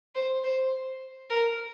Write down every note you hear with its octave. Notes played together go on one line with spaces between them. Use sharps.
C5
C5
A#4